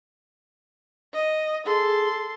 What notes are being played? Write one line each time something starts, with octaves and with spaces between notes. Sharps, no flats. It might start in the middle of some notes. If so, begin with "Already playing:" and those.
D#5
G#4 A4 C6